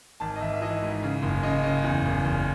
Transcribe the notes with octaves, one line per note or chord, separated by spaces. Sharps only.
G#1 A5
D#5
G#1 E5
E5
E3 D#5
G#2
C#3
F#1
C#3 D#5
C#3
E2
F#1
F#1